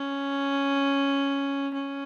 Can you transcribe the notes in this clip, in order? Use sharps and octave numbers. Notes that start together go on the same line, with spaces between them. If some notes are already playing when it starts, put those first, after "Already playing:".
Already playing: C#4
C#4